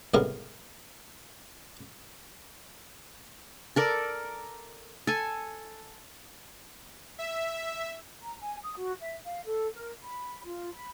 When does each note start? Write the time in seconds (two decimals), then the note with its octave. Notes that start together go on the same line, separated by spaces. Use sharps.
0.14 C2 A2 C#3 G#3 B3 A#4
3.76 A4 A#4 D5
5.07 A4 G#5
7.19 E5
8.23 A#5
8.41 G#5
8.62 D#6
8.77 F#4
9.00 E5
9.24 F5
9.46 A4
9.74 A#4
10.02 B5
10.44 F4
10.74 B5